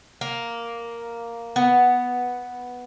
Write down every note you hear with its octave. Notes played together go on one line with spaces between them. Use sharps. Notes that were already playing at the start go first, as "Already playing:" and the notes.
A#3
B3